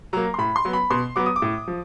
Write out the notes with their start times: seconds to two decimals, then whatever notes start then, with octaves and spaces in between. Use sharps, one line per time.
0.13 F#3 A#3 A#5
0.34 C6
0.38 A2 B5
0.56 C6
0.65 F#3 B3
0.73 B5
0.91 B2 C6
1.16 F#3 B3 D6
1.26 D#6
1.36 D6
1.42 A2
1.68 F3